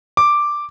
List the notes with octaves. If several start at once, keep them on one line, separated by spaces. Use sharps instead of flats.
D6